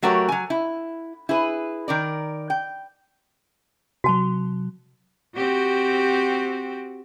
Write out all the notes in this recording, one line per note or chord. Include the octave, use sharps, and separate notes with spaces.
F#3 A3 F#4 G4 A#4 C#5
F#3 G#5
E4
E4 G#4 B4
D#3 A#4 D5
G5
C3 F#3 F#4 A5
C4 F#4 G4